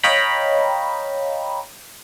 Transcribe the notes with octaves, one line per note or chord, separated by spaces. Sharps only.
C#5 D#5 F5 G5 A#5 B5